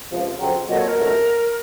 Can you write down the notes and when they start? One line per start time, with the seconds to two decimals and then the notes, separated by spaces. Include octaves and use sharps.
0.12 C#2 C3 F3
0.40 F2 C#3 F#3 C4
0.69 A#2 F#3 C4 F#4 A4 D#5
0.78 C#5
0.88 A#4
0.97 C#2 C3 D#3 F#3 A3